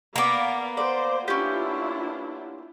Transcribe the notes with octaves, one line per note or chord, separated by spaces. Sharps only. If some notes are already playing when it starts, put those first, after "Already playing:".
A#3 B3 D5 F5 A#5 D6
C5 D5
C#4 D4 E4 F4 G4